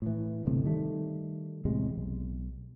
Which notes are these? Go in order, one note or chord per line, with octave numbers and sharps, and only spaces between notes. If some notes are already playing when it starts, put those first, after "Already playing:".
A2 E3
D1 G1 A2 C3
D#3 G3 A3
E2 A2 C3 G#3
B1